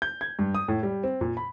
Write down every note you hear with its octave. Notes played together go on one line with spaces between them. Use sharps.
G6
G#6
G2
D#6
A2
G3
C4
A#2
B5